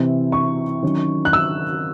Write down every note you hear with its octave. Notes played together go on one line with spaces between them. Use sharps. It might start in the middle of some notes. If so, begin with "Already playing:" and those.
Already playing: C3 E3 C4 E4
C#6
D#3 F#3 C#4
F#6
E6